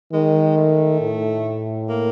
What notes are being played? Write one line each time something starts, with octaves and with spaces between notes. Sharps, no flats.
D#3 G#3
A3
A2
A#3